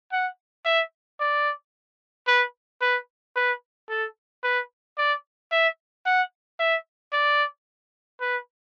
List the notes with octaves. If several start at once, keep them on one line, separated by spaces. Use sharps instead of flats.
F#5
E5
D5
B4
B4
B4
A4
B4
D5
E5
F#5
E5
D5
B4